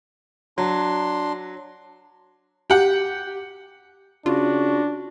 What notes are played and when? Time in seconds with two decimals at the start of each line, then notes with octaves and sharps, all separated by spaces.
0.58 F#3 D4 C6
2.70 G4 F#5
4.26 C#3 D4 F4 F#4